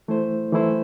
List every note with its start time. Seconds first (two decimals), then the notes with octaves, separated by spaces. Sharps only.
0.08 E3 A3 E4 C5
0.52 E3 A3 E4 C5